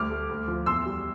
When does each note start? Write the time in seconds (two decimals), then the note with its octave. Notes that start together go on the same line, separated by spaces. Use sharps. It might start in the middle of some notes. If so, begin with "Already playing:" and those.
Already playing: D2 G3 D6 F6
0.10 A3
0.29 D2
0.48 F3
0.66 E2 C6 E6
0.86 G3